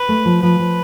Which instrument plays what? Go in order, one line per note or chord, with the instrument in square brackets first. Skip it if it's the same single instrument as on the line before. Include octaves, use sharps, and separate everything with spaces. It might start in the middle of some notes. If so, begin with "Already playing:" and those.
Already playing: [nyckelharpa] B4
[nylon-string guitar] A3
F3
[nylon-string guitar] F3 [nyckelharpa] B4
[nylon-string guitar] F3